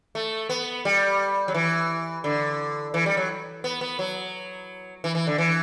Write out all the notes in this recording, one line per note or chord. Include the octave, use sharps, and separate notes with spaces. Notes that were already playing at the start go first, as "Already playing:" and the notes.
A3
B3
G3
F#3
E3
D3
E3
G3
F#3
B3
B3
F#3
E3
E3
D3
E3